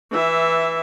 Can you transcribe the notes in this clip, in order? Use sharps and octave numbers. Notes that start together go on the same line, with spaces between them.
E3 E5